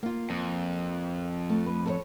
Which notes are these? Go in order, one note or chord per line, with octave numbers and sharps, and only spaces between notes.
A#3 F4
F2
A3
B4
A4 A#4 C#5